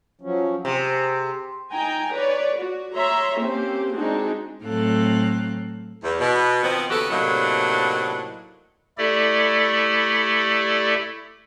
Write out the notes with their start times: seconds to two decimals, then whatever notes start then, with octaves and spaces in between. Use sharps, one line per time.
0.21 F3 F#3 C#4
0.65 C3 G#4
1.72 D#4 G5 G#5 A#5
2.14 B4 C#5 D5
2.57 F#4
2.94 C#5 E5 A#5 C6
3.39 A#3 C4 C#4 G4 C5
3.95 G#3 C4 D4 D#4 F#4 G#4
4.63 A2 F#3 C4 A4 F5 F#6
6.03 E2
6.20 B2
6.64 D#3 F3 B3 C4
6.90 D#2 C#3 B3 F#4 G4 A4
7.10 A2 C3 F#3 A#3 D4 D#4
8.98 A3 E4 G4 A4 D5